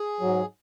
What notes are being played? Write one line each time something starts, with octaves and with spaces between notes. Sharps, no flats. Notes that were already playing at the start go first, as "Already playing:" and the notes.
Already playing: G#4
G#2 F#3